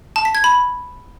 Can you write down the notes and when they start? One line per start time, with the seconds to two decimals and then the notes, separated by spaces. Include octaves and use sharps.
0.16 A5
0.25 B6
0.35 G#6
0.44 B5